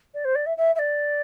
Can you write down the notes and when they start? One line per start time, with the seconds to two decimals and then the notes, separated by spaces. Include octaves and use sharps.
0.14 D5
0.24 C5
0.35 D5
0.46 E5
0.57 E5
0.75 E5
0.79 D5